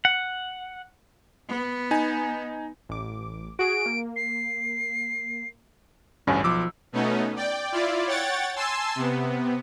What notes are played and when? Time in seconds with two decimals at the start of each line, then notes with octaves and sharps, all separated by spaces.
0.05 F#5
1.49 B3
1.91 D#4 G#5
2.89 A1 D6
3.59 F#4 G#4 D7
3.86 A#3
4.16 C7
6.27 A1 D2 G2 C#4
6.44 B1 F3 D6 E6
6.92 B2 A3 B3 C#4 D#4
7.36 D5 G5
7.72 E4 F4 D5
8.07 C#5 F#5 G5 A6
8.56 G#5 A5 C6 E6
8.95 C3 B3